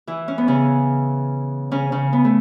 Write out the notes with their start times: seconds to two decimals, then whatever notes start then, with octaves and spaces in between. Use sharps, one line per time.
0.07 E3 E4
0.28 C#4
0.38 B3
0.47 C#3 C#4
1.71 C#3 C#4
1.92 C#3 C#4
2.13 B3
2.24 A3